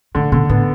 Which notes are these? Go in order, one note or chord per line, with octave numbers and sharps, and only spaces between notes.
A2 D3
B2 D3
A2 B3